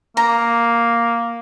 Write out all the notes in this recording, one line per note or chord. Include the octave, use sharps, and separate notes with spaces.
A#3 A#5